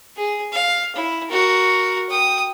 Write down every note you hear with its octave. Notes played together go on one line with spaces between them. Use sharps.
G#4
F5
E4
F#4 A#4
G5 D#6